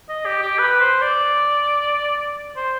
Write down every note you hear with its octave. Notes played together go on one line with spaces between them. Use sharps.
D#5
G4
G4
B4
C5
D5
C5